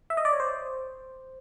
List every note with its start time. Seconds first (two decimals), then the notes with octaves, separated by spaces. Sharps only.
0.10 E5
0.17 D#5
0.25 D5
0.33 C#5
0.40 C5